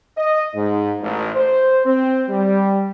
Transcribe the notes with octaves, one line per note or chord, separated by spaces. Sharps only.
D#5
G#2
A1
C5
C4
G3